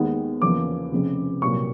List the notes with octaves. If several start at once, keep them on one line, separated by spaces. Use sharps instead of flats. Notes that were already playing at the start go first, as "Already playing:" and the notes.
Already playing: D#2 D#3 G#3 B3
E2 C#3 F3 A#3 D6
F1 F2 C#3
C2 A#2 F#3 A#3 C#6